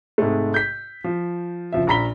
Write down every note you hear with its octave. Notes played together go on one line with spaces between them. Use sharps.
G#2 C3 G#3 A3
G6 B6
F3
F#1 F3 E5
A#1 F4 A#5 B5 B6 G7